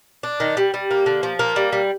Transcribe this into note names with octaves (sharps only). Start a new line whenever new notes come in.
D4
D#3
G3
G3
A#3
D3
F3
A#3
G3
G3